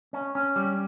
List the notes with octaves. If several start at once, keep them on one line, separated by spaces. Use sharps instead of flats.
C#4
C#4
G3